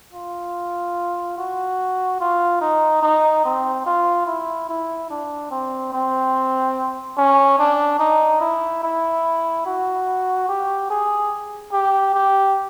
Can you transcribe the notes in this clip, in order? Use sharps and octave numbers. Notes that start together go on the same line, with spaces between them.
F4
F#4
F4
D#4
D#4
C4
F4
E4
E4
D4
C4
C4
C#4
D4
D#4
E4
E4
F#4
G4
G#4
G4
G4